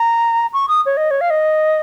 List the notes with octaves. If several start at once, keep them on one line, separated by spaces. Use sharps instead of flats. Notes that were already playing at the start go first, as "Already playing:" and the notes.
Already playing: A#5
C#6
D#6
C#5
D#5
C#5
F5
D#5